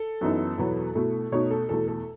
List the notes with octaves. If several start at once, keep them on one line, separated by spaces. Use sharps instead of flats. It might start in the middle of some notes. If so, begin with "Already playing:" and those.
Already playing: A4
F#2 E3 B3 D#4
E2 B2 F#3 B3
B2 A3 E4
B2 A3 D#4 C#5
A4
E2 B2 A3 A4
A4